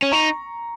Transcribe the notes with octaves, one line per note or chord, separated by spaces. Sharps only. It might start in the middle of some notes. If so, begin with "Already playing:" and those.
C#4
D#4 A#5 C#6